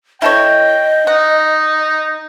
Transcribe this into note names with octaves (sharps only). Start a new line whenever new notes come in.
E4 A4 C#5 D#5 G5
D#4 F#5